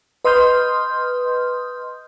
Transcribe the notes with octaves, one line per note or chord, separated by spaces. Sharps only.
B4 D#5 C6 D#6 F6 G6